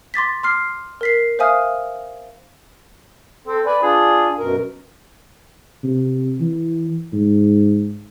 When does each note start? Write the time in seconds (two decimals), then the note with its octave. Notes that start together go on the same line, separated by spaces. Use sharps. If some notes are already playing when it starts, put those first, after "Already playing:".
0.14 C6 D6 A6 B6
0.43 C6 D6 F6 C7
1.01 A#4 B6 C7
1.39 C5 E5 F5 G#5 D#6 F6
3.47 C4 A4
3.66 B4 D5 G#5
3.83 D4 F4 G#4
4.39 F#2 B2 A#4
5.84 C3
6.40 E3
7.13 G#2